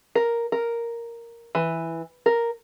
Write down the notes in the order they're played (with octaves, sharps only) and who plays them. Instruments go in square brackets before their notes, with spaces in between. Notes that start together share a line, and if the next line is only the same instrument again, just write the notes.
[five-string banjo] A#4
A#4
E3
A#4